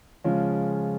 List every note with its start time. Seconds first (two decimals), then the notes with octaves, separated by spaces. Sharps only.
0.24 C#3 F3 G#3 C#4 F4